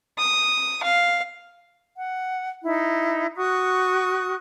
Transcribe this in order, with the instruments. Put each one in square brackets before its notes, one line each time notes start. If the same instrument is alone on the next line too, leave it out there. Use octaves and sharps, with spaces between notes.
[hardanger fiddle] D#6
F5
[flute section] F#5
D#4 E4
F#4 C#6 D#6 F#6